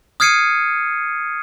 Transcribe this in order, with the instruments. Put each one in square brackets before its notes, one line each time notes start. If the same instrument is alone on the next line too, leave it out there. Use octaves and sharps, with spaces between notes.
[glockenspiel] D#6 F6 G#6 C7 C#7 D#7